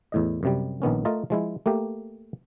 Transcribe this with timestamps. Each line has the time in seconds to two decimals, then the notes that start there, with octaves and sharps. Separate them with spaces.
0.12 E2 A2 D#5
0.43 F#2 C3 G3
0.82 A#1 D#3 B3 C#4
1.05 A3 F4 A#4 D#5 A5
1.30 F3 G#3 E4
1.66 A3 A#3 G4